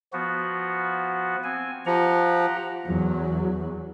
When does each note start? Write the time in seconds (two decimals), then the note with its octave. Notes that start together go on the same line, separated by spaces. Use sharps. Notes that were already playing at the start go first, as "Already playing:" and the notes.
0.13 F3 B3 F#4
1.44 C4 G#5
1.86 F3 G4 F#5 A#5
2.85 E2 F#3